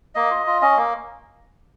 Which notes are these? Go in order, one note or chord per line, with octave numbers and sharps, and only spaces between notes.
A#3 D#5
F4
F4
C#4 D#5
A#3